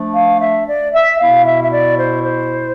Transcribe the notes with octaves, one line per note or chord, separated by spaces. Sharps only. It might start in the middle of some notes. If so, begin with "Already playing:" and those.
Already playing: F3 A3 D4
F5
E5
D5
E5
B2 B3 E4 F5
E5
E5
D5
C5
C5